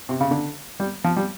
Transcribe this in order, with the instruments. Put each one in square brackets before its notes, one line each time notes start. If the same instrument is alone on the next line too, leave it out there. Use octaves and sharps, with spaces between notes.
[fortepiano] C3
C#3
D3
G3
F3
G3